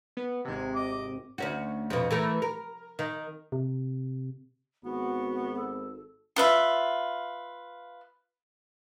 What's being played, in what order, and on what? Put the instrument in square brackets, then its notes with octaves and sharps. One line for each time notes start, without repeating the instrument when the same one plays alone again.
[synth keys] B3
[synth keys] G#1 C3 [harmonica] G#3
[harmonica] D#5 D6
[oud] D2 C#4 F#4
F2 B2
E3 A3 A#4
A#4
D#3
[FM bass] C3
[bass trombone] G#1 [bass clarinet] B3 [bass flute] F#4
[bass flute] A4
[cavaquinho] F4 B4 E5